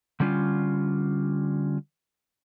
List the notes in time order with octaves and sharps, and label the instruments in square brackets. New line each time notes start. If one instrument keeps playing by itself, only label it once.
[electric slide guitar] D3 G3 C#4 F4